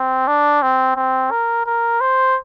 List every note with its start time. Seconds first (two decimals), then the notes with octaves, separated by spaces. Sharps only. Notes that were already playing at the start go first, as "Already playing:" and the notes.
Already playing: C4
0.27 D4
0.62 C4
0.96 C4
1.31 A#4
1.66 A#4
2.01 C5